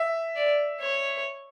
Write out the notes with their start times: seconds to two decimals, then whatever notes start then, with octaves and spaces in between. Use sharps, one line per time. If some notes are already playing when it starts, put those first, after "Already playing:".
Already playing: E5
0.35 D5
0.80 C#5